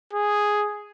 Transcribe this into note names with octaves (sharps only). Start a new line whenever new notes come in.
G#4